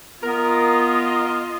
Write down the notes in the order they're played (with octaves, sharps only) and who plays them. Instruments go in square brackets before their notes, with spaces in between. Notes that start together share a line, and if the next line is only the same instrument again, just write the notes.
[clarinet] B3 [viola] F4 D#5 [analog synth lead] A#4